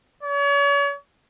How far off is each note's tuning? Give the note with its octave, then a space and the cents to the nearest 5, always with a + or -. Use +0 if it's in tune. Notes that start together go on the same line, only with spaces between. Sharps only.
C#5 +40